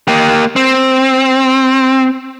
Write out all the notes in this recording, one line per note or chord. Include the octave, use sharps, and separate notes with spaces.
A#3 G4
C4